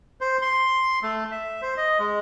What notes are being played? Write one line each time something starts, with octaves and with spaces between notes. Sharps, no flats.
C5
C6
A3
E5
C5
D#5
G#3